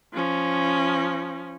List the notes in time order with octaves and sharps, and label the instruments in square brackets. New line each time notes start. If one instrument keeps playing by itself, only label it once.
[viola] F3 C#4